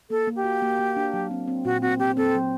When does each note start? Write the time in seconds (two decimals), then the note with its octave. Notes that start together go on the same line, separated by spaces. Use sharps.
0.10 A#3 A4
0.27 A#3
0.36 G4
0.44 F#4
0.62 A#3
0.79 A#3
0.96 D4
1.14 F#3
1.31 C4
1.48 C4
1.65 A#2 F#4
1.82 C4 F#4
1.99 C4 G4
2.17 C4 A4
2.35 F#3